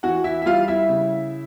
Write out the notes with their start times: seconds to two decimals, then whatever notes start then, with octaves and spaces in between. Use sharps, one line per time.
0.03 E3 F#4 F#5
0.24 E4 E5
0.42 E5
0.46 G3 F4 F5
0.68 E4 E5
0.89 C#3